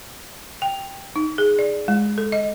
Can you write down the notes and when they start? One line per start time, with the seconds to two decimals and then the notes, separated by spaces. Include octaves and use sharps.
0.62 G5
1.16 D#4
1.38 G#4
1.59 D5
1.88 G#3
2.18 A4
2.32 D#5